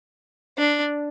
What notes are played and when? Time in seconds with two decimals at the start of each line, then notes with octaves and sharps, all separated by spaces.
0.58 D4